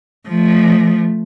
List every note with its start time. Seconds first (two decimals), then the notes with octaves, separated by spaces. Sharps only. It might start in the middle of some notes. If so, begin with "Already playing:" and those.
0.29 F3 A3